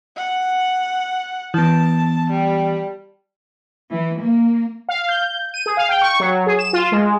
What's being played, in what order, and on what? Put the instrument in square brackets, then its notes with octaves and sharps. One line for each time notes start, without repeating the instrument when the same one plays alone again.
[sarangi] F#5
[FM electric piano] E3 B3 [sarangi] A5
[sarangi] G3
[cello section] E3
A#3
[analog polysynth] F5
G6
D#7
G#4
F5
G5
C#6
F#3
G#4
E7
F4
G#3